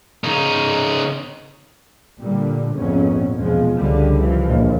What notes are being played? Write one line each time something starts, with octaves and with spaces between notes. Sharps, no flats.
C#3 D#4
A#2 D3 G3
A#1 F2 G#2 B3 C#4
E2 B2 F3 G#3
C#2 D3 F3 G3
E3 F3
A#1 D#2